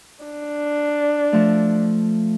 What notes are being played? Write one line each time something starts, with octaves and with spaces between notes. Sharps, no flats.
D4
F3 A3